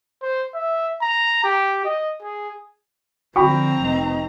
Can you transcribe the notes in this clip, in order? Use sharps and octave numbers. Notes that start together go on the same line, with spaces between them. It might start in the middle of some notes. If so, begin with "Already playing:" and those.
C5
E5
A#5
G4
D#5
G#4
D3 F3 C4 G5 A#5 B5 C#6
F1 D#4